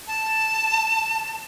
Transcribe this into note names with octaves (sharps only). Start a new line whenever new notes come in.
A5